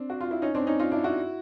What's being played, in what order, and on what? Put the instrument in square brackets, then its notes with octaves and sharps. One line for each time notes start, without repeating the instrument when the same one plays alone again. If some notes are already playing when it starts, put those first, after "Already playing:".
Already playing: [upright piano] C4 D4
F#4
F4
E4
C#4 D#4
C4 D4
C#4 D#4
D#4 F4
D4 E4
E4 F#4